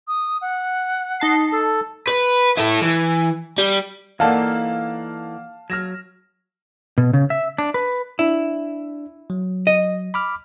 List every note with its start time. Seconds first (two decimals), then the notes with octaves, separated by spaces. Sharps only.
0.08 D#6
0.41 F#5
1.20 D#4 A5 C7
1.52 A4
2.07 B4
2.57 E4 A4
2.82 E3
3.58 G3
4.20 E3 A#3 D#4 A4 D5 F5 F#5 A5
5.70 F#3 F6 A#6 E7
6.98 B2
7.13 C#3
7.30 E5
7.58 D4
7.74 B4
8.19 D4 E4
9.30 F#3
9.67 D#5
10.14 B5 D6 F6